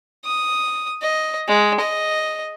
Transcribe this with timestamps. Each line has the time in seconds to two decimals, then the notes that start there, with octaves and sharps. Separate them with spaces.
0.25 D#6
1.02 D#5
1.48 G#3
1.80 D#5